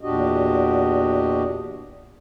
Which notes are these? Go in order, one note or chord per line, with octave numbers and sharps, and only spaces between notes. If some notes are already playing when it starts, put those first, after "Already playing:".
E2 A#2 D4 F#4 G4 D#5